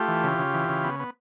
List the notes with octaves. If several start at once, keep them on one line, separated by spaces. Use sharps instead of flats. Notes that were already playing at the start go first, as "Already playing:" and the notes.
Already playing: A3 F4 G4
E3
C#3
C#3
E3
C#3
B3
B3